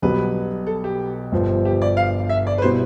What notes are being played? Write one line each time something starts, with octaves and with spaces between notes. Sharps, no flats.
B1 B2 G3 B3 B4
A4
G4
G1 G2 F3
G4
D5
F5
E5
D5
B4
B2 G3 B3 E4 C5